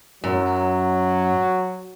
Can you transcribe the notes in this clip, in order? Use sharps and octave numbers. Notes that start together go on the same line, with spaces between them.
F#2 F#3